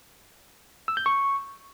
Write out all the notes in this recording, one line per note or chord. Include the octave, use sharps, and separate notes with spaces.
E6
G6
C#6